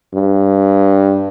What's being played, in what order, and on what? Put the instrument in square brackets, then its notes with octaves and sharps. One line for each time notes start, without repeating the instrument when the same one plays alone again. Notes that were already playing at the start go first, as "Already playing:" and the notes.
[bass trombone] G2